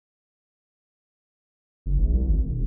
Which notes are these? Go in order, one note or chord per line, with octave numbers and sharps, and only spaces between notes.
F#1
A#1
C2
G#1
E1